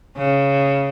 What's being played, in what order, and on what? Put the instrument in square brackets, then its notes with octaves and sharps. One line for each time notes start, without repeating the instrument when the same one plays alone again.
[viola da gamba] C#3